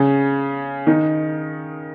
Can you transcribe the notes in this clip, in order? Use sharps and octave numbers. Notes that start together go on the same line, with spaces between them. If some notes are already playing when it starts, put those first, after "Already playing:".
Already playing: C#3 C#4
D#3 D#4